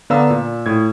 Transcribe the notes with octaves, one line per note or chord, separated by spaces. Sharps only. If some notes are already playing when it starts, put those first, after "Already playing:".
D3 B3 D5 F5 A#5 E6
A#2
A2 G#6